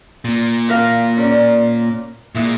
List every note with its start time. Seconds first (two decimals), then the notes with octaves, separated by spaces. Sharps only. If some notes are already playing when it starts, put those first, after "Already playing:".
0.25 A#2
0.69 E3 A#4 F5
1.17 C#4 A#4 D5
2.35 A#2 E3 G#3 E4